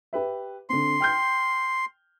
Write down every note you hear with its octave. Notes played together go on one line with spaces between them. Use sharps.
G4 B4 E5
D3 C4 C6
G5 F6 G6